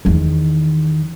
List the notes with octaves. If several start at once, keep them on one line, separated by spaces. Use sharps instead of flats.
E2 D#3